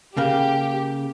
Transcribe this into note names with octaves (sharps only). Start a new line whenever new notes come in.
C#3 A#3 G4